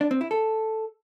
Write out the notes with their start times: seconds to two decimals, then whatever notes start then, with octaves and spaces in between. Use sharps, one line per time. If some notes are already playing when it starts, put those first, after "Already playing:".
0.01 D4
0.11 C4
0.21 E4
0.31 A4